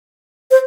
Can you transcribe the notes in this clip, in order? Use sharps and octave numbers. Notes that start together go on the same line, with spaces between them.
C5